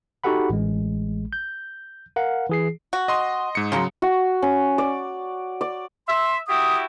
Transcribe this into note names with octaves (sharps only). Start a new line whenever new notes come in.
D#4 F#4 G4 A4 F#5 B5
A1 G#3
G6
A#4 F5 F#5
E3 G#4 C7
F#4
D#5 C6 D#6
G#2 C#7
C#3 F#3 G#3 A#3 C6
F#4
C#4
D5
D5
E5 C6
E4 F#4 G4 D#6